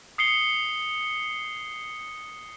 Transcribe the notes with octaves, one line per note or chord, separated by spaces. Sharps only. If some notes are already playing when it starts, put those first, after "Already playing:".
D#6 C7 C#7 G7